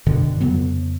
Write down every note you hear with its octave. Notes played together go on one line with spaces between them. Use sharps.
F#2 B2 D3 D#3
F2 C#3 F#3 B3